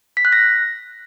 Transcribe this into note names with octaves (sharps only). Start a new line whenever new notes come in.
B6
F#6
A#6